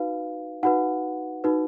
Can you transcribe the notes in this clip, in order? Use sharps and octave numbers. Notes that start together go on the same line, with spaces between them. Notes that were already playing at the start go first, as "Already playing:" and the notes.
Already playing: D#4 F#4 B4 F5
D#4 F#4 B4 F#5
D#4 F#4 B4